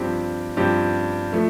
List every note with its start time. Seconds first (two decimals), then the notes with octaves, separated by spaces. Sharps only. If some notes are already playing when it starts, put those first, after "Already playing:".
Already playing: G2 F3 C4 G4
0.57 G2 F3 C4 G4
1.32 F3 A3